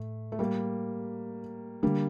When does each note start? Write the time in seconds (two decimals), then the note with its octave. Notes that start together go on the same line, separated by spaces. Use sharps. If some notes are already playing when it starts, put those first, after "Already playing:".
Already playing: A2 A3
0.32 A3
0.39 G3 A#3
1.83 D3 G3 A3 A#3 D4